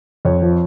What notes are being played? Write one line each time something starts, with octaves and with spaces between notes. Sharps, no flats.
F2 C#5
F3